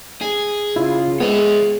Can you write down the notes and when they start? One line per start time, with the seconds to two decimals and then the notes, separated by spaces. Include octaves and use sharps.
0.21 G#4
0.76 C#3 E4 F4
1.20 G#3 B3 G#4 C#5 E5